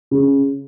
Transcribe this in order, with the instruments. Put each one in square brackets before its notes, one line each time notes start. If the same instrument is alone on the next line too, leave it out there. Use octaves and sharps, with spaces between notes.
[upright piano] C#3